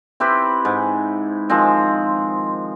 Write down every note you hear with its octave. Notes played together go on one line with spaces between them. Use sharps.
C4 E4 G4 B4
G#2
D#3 F3 G#3 C4